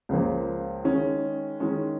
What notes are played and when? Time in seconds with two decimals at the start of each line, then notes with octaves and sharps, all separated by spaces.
0.09 C#2 C#3 F3 A#3
0.84 D#3 G#3 C#4
1.60 D#3 G#3 C#4